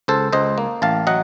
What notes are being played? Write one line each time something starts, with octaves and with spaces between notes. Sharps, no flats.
C#2 A4 C5
C#2 C5 D#5
A#3
A1 F5 A5
F#3 D#5 F#5